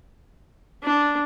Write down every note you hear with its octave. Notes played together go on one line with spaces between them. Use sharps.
D4